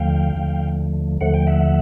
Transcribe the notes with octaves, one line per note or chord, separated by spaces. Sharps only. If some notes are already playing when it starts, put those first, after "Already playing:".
Already playing: D#2 D3 F3 A3 F5 G5
D#2 D3 F3 A3
D#2 D3 F3 A3 F#5
G5
E5 F#5